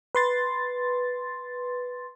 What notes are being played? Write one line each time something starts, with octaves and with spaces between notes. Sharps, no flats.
B4 C6 A6